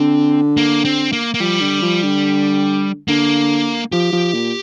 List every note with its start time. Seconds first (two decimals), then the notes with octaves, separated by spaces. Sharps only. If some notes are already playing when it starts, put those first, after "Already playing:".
Already playing: D3 C4
0.57 A#3
0.85 C4
1.12 A#3
1.34 A#3
1.40 F3 G3
1.61 D3
1.82 F3
2.03 D3
3.08 D3 A#3
3.92 F3 G4
4.13 F3
4.34 A#2